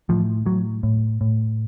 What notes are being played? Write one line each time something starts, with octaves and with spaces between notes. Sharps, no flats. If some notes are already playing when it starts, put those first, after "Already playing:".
A2 F3
A2 F#3
A2
A2